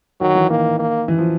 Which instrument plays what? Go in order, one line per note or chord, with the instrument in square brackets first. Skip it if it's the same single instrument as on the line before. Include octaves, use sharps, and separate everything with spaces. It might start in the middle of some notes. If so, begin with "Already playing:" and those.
[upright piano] D#3 [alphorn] F#3
[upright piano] E3
[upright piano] D#3 [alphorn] A#3
[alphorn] A#3
[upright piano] E3
F3